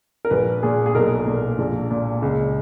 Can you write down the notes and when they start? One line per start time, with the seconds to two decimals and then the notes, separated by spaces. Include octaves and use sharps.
0.25 A#4
0.30 A#1 B4
0.63 A#2 G#4
0.86 G#4
0.94 B1 A#4
1.26 A#2
1.58 A#1
1.91 A#2
2.22 C#2